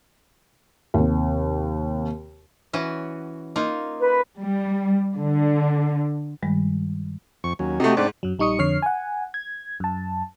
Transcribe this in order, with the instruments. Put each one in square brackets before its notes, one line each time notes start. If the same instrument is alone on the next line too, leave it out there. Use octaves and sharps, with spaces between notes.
[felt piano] D#2 C3
[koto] E3 C#4 F#4
A#3 D#4 F4
[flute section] B4
[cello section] G3
D3
[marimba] G2 D#3 G3 G#3
[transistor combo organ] F2 C#6
D#2 F#3 C#4
[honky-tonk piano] C3 A3 [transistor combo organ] F#4 G4 D#5
[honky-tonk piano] G#2 [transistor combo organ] C4 D4 D5
[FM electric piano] F#2 F#3
A#1 G3 D#4 C#6 D#6 C#7
F2 D3 C#5 C#6 F6 C7
F#5 G#5
G#6
F#2 A5